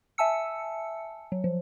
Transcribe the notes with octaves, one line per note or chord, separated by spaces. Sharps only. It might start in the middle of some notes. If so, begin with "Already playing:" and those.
E5 G#5 A5 E6 C#7
F#3
F3